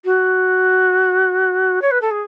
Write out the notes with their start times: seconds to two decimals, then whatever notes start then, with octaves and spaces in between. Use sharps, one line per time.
0.05 F#4
1.82 C#5
1.91 B4
2.01 A4
2.11 G#4